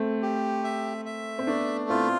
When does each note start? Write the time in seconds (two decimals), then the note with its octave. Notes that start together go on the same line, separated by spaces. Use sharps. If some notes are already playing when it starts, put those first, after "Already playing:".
Already playing: A3 C4
0.22 G4
0.64 E5
1.05 E5
1.38 C4
1.47 A3 B3 D4
1.89 C4 E4 F4